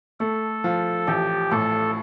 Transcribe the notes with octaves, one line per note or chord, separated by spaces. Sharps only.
A3 A4
F3
A1 G4
A2 A4